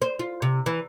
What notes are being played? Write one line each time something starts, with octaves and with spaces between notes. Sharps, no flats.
C5
F4
C3
E3